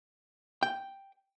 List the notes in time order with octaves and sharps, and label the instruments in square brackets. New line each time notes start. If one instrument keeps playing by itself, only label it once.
[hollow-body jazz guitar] G5